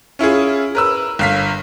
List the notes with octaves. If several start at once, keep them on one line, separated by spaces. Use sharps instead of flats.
C#4 E4 F4 G#4
A#4 B4 E6
G1 F5 B6